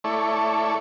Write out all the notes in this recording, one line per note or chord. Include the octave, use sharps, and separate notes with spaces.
A3 E4 A4 C#5 D5 C#6